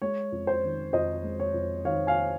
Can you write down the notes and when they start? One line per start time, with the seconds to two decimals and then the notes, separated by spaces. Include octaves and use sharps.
0.02 G#3 C#5
0.32 F2
0.47 C5
0.63 D#3
0.93 F2 C5 D#5
1.23 G#3
1.40 C#5
1.54 F2
1.85 D#3 C#5 F5
2.07 F5 G#5